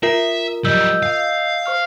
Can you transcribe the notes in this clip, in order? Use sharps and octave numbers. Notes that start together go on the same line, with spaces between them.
F4 A#4 E5
F#3 G3 D#5 E6 G6
F5
C5 C#6 F6